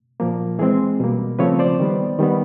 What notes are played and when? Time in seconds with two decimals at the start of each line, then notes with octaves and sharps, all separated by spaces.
0.20 A#2 F3 A#3
0.59 E3 G#3 C4 G#4
1.00 B2 G3 A#3
1.39 C#3 F3 A3 C4 B4 C#5
1.59 C5 D5
1.80 D#3 G3 B3
2.19 D#3 G3 B3